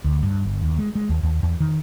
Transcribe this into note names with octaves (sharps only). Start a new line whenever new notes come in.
D2
G2
G1
D#2
G#3
G#3
D#2
D#2
E2
D#3